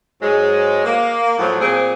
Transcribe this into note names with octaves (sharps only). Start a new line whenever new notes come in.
G#2 F#3 G#3
A#3
A2 F3 F#3
A#2 C4 G#4